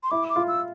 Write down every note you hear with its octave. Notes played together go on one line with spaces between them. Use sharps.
C6
E4 D6
D6
F4
E6